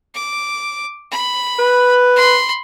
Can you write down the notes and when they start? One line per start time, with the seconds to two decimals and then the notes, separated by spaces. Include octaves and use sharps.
0.14 D6
1.11 B5
1.59 B4
2.16 B5 C6